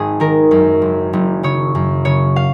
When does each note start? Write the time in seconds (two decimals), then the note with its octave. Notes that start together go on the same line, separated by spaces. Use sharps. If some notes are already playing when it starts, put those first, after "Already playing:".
Already playing: G#1 G#4
0.20 D#3 A#4
0.51 F#2
0.82 F#1
1.13 F#1
1.43 C#3 C#5
1.75 F#2
2.05 C#3 C#5
2.36 F5